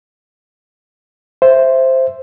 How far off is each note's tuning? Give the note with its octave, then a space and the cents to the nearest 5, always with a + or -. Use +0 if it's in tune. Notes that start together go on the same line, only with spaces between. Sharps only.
C5 +0 E5 +10